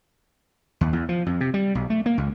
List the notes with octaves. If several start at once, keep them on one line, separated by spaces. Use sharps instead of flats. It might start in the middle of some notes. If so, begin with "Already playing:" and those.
D#2
E2
F3
F2
C3
G3
B1
A3
A#3
C#2